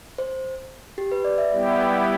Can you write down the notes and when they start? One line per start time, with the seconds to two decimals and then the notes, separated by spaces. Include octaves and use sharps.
0.18 C5
0.98 G4
1.12 B4
1.24 D5
1.38 E5
1.51 G3 B3 E4 G4 D5